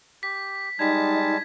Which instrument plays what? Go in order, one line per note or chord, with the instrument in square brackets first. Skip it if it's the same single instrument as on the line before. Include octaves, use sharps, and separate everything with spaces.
[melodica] G4 [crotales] B6
[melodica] G3 G#3 A5 [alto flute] D#4 [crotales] G#6 B6